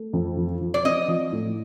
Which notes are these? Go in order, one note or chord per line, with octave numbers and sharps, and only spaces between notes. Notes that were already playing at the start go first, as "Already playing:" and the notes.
Already playing: A3
F2
F3
F3
D5
C4 D#5
F3
A2